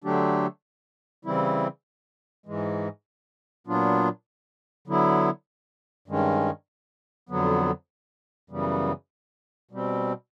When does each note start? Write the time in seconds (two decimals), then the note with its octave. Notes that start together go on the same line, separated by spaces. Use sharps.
0.04 D3 F#3 A3 D4 G4
1.25 C#3 E3 G3 C4 E4
2.46 G#2 E3 G#3
3.67 A#2 F#3 B3 D4 F4
4.87 D3 F#3 B3 E4
6.08 G2 D#3 G#3 C#4
7.29 F2 D3 F#3 B3
8.50 F#2 C#3 E3 G3 B3
9.71 B2 G3 C4